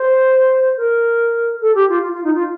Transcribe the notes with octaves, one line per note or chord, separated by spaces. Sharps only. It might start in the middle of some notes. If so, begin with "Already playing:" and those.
Already playing: C5
A#4
A4
G4
F4
F4
F4
D#4
F4